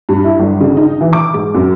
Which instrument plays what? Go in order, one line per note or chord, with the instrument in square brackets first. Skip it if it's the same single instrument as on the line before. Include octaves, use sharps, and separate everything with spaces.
[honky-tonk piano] G2
E4
G1
C#3
D#4
E3
D6
G#2
F#2